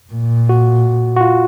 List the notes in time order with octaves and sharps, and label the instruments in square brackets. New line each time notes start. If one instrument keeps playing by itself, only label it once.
[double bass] A#2
[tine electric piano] F#4
F#4
F4